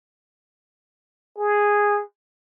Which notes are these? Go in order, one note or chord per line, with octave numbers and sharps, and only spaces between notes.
G#4